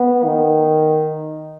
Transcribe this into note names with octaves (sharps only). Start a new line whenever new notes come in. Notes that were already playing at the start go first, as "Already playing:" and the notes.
Already playing: B3
D#3